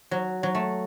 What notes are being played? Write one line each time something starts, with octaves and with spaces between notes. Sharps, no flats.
F#3
F#3
A3